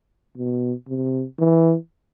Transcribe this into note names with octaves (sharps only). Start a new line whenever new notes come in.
B2
C3
E3